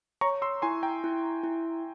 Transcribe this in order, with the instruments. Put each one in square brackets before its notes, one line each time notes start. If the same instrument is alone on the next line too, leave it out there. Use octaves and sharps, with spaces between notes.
[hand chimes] C#5 [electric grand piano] A#5 C#6
[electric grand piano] C6 E6
[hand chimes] E4 [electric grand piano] G#5 C6
[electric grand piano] G5 A#5
[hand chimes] E4
E4